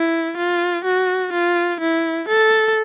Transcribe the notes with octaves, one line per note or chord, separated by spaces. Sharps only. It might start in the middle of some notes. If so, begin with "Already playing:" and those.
Already playing: E4
F4
F#4
F4
E4
A4